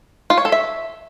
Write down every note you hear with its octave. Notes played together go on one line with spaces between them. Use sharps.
F4
C#5
A4
E5